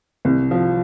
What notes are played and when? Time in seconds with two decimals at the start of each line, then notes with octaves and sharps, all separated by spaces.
0.25 C2
0.51 F3